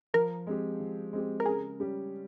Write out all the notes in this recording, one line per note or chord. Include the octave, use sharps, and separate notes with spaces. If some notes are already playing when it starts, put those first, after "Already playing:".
F3 A#4
G#3 C4 G4
F3
G#3 C4 G4
A#4
C#3 G#4
G3 C#4 G4